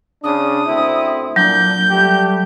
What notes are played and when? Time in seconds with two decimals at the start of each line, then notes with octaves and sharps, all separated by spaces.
0.24 C#3 D4 D#6
0.67 D2 C4 E4
1.36 A#2 F#3 D4 G6
1.91 G3 A3 G4